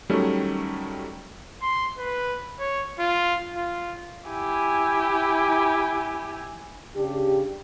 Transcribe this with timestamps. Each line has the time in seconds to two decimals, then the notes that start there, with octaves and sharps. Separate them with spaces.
0.09 D#3 F#3 G3 A3 C#4
1.62 C6
1.99 B4
2.60 C#5
2.99 F4
3.56 F4
4.28 E4 G4 G#5
6.96 C#3 D4 G4